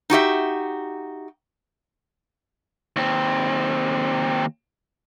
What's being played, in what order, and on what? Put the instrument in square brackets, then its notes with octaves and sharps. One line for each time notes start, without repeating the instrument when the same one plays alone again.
[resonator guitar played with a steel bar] D#4 F#4 G4 E5
[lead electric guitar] D#2 C4